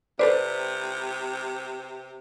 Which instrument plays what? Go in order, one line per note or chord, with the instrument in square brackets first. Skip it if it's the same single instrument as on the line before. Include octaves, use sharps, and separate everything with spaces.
[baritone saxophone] C3 [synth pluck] A4 C5 D5 [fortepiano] B4